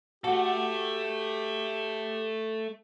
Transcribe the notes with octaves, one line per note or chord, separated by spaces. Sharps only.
A3 F#4 G4 A4